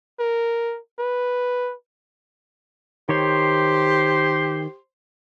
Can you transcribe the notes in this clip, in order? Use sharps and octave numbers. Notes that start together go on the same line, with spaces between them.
A#4
B4
D#3 G4 C5 C#5 C6